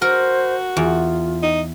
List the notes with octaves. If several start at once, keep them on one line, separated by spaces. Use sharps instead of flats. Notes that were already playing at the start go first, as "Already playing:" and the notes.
F#4 A#4 C5
E2 F4
D#4